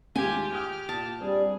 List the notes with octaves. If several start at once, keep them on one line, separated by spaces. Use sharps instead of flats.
D#2 A2 G#3 F4 G4 G#5
G4 D#6 F6 F#6 D#7
A#2 A5 D#6
G3 C4 D4 G#4